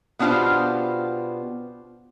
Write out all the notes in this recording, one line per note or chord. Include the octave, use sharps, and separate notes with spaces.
B2 B3 D4 F4 G4 C5